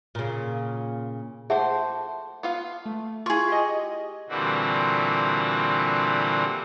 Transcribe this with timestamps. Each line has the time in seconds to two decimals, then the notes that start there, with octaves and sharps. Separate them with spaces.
0.15 A#2 C#3
1.50 F3 A3 G#4 C5 E5 F#5
2.43 B3 F4 F5
2.86 A3
3.26 E4 F4 G#4 C#6
3.48 G4 D#5
4.29 A#2 D3 E3 G3 C4 F#4